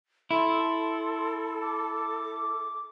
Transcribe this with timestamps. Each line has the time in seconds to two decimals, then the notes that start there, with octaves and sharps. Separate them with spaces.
0.31 E4 A4 C6
1.62 D6